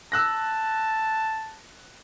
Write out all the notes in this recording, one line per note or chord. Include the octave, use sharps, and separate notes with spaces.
A5 E6 F#6 A#6